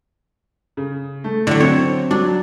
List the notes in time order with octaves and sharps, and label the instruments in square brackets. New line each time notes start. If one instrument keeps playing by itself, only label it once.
[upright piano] C#3
A3
[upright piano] A2 E4 [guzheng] D3 F#3
[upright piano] C4 [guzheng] C#5
[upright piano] F#3 [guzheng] D4